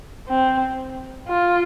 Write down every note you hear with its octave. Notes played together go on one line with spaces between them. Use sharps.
C4
F4